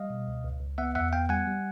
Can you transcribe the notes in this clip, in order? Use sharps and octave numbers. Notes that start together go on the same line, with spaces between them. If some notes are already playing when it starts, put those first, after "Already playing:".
Already playing: G3 D#5 F5
B2
C#2
C#2
C#2
B3 E5 F#5
E2 E5 F#5
B3 F5 G5
G3 F#5 G#5
G3